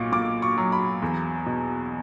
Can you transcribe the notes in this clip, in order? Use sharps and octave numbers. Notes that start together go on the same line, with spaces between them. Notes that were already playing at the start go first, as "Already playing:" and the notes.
Already playing: B1 A#2 C#6 D6
A#2 D6
C#6
F#3
B5
E2
B2